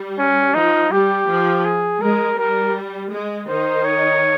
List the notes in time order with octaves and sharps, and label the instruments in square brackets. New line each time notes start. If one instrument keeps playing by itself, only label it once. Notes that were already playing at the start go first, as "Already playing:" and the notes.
Already playing: [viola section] G3
[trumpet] C#4
[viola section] F3 [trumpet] D#4
[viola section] G3 [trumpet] G4
[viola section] F3
[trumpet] G#4
[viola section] G#3 [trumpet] A#4
[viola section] G3 [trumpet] A#4
[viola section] G#3
[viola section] D#3 D#4 [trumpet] C5
[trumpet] C#5